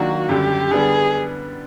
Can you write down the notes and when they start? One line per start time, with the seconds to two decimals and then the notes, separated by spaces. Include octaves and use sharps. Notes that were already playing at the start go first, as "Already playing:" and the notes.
Already playing: D#3 F#3 A#3 D4 F4 F#4
0.29 F#2 D3 G3 G4
0.71 D3 G3 B3 D4 G#4